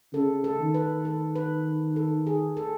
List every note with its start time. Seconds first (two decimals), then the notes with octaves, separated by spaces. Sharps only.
0.13 C#3 A4
0.44 A4
0.59 D#3
0.74 B4
1.05 A4
1.36 B4
1.96 A4
2.27 G#4
2.57 A4